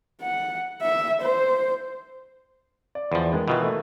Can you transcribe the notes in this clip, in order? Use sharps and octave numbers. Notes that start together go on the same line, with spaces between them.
F#5
E5
C5
D5
E2 F3
D#3 G#3 B3
B2 D#3 E3 F4
A3 A#3